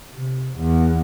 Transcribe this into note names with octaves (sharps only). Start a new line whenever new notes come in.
C3
E2